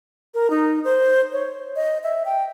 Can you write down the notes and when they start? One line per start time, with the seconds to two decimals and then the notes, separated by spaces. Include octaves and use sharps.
0.34 A#4
0.50 D#4
0.84 C5
1.32 C#5
1.76 D#5
2.04 E5
2.25 G5